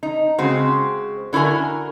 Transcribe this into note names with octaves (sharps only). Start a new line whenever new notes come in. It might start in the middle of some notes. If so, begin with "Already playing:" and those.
D#4
C#3 G#3 C4 F#4
D3 E4 F#4 A#4 G#5